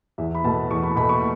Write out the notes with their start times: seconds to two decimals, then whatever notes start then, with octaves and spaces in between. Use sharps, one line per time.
0.18 E2 E5
0.35 B5
0.44 B2 A3 A5
0.71 E2 C#6
0.83 B5
0.96 B2 A3 B5
1.09 C#6